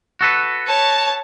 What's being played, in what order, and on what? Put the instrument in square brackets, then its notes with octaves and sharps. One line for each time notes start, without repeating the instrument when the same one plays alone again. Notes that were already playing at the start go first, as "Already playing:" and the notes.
[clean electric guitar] F#4 A4 B4
[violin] C#5 A5